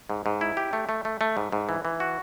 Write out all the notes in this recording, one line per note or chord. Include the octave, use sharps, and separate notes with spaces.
G#2
G#2
E4
G4
A3
A3
A3
A3
G#2
G#2
E3
E3
F#4